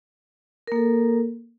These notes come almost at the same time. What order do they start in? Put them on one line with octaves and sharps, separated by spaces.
A#4 A#3 A4